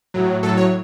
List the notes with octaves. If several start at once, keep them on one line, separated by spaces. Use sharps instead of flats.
A2 F#3
A2 F#3 A4
C#5